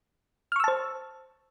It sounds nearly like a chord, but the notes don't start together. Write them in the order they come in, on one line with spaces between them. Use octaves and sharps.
F6 C#6 E6 A5 C5